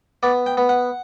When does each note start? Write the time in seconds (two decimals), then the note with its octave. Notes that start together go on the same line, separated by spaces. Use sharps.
0.23 B3 D5
0.46 G5
0.57 B3
0.69 F#5